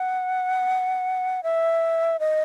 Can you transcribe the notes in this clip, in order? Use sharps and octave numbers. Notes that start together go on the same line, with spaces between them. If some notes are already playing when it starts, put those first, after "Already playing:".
Already playing: F#5
E5
D#5